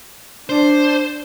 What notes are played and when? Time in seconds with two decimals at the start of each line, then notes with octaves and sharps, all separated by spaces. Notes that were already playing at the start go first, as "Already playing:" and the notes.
0.49 D4 C5